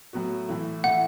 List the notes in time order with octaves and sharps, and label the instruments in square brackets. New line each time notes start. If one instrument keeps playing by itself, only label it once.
[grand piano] A2 F#3 B3 F#4
A2 E3 A3 E4
[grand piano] A2 E3 A3 E4 [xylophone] F#5